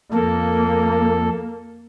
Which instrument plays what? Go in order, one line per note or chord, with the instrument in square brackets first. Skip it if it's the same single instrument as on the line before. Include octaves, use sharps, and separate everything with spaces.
[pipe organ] F2 A4 [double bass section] A#3